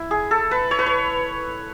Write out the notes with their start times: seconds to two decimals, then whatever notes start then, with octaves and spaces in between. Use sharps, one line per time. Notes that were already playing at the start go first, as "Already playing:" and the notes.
Already playing: E4
0.11 G#4
0.31 A4
0.51 B4
0.71 C#5
0.79 B4
0.86 C#5